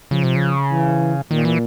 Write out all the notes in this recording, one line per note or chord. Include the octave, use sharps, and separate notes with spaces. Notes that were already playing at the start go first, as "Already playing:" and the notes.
C#3 F3
C3
C#3
E3
A#2 D#3
E3